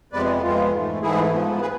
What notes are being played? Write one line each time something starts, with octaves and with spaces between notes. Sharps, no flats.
F2 C3 G#3 B3 B4 D5
F2 C3 G#3 B3 F4
G#2 E3 A3
G#2 E3 A3 E4 G#4
G#2 F3 B3
G#4 B4